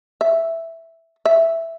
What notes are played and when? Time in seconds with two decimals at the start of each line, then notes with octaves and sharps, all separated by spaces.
0.21 E5
1.25 E5